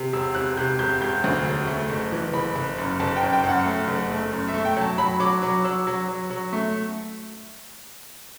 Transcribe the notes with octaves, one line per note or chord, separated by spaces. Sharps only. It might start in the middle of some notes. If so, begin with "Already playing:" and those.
Already playing: C3
E1 E6
C3 F#6
C3 G6
E1 G6
E1 G6
D2
E1
A3
F#1
E3
F#1 B5
F#1
F#2
F#1 A5
G5
F#2
G5
F#2
F#5
A3
F#1
A3
F#2
E5
A3
G5
F#3 A5
F#3 B5
F#3 D6
F#3 D6
F#3 E6
F#3
F#3
F#3
A3